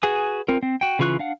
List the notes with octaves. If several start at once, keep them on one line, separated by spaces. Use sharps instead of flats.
F#4 G#4 B4 G#5 D#6
C4 F4 A#4
C4
F#4 G5
C#3 E3 F4 C#6 F#6
D4 F5 F#5